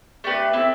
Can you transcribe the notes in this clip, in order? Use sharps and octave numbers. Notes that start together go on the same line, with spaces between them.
A3 D4 G4 B4
C4 E4 A4